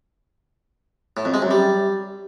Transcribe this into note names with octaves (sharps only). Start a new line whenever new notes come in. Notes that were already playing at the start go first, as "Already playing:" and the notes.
A2
F2
G#3
F#2
G3